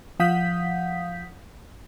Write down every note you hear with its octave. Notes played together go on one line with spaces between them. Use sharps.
F3 F5 F#5 D#6 G6 B6